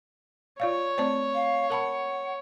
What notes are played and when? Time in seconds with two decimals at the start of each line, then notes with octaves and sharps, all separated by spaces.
0.60 F4 C#5 D5 F5
0.98 A3 C4 C5 D5 A5
1.34 F5
1.70 A#4 F#5 A5 B5